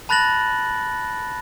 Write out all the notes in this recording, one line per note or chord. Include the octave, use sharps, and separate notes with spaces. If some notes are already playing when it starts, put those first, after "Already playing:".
A5 B5 F#6 A6 A#6 F#7